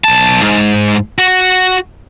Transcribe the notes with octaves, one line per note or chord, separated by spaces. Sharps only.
B1 A5
G#2
F#4